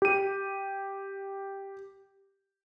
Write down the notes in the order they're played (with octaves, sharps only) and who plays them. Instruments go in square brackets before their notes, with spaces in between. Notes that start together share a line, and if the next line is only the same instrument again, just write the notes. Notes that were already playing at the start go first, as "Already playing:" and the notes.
[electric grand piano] G4 D#7